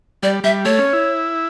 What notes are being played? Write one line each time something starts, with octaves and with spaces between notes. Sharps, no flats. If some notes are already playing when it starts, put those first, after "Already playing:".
G3 D5
G3 E5
A3 C#5
C#4
E4